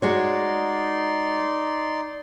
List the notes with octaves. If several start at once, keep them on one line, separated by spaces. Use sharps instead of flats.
G#3 D#4 F#4 C#5 D5 C6